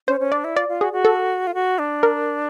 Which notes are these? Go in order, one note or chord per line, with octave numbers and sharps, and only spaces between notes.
C#4 C5
C#4
D4 D5
E4
F4 D5
F4
F#4 G#4
F#4
A4
F4
F#4
D4
A#4